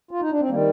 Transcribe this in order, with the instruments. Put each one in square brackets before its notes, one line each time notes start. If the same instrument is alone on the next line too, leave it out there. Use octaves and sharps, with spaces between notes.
[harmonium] F4
D#4
D4
C4
D#3 G3 A#3